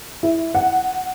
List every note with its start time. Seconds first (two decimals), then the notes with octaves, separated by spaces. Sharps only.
0.23 E4
0.55 F#5